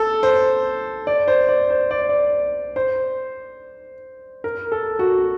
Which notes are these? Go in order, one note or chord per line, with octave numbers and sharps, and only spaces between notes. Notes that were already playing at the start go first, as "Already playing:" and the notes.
Already playing: A4
C5
D5
C5
D5
C5
D5
D5
C5
A#4
A4
F#4